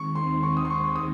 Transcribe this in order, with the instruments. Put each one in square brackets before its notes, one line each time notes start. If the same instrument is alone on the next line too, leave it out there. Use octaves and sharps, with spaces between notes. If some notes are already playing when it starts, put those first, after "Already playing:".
Already playing: [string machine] D#2 D#3 G#3 C4 [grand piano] C#6
[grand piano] C6
C#6
D#6
C6
C#6
C#6
D#6